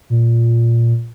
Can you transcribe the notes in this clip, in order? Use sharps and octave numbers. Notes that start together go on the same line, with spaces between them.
A#2